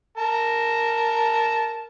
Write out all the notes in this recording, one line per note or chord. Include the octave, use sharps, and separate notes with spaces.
A#4 A5